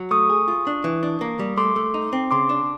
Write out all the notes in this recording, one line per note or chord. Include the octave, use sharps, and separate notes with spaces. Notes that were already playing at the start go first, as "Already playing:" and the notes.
Already playing: F#3
A3 C#6 D#6
G#4
F4
D4
E3
D4
A#3
G3
A3 C6 D6
A3
D#4
C4
C#3 C6 D6
D4